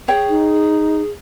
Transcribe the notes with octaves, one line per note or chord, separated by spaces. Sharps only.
G#4 C#5 G5
D#4